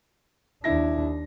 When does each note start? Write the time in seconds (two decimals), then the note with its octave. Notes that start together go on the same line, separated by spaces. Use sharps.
0.64 D#2 D4 E4 A#6